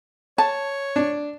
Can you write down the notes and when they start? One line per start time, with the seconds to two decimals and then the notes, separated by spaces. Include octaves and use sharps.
0.38 C#5 A5
0.96 D4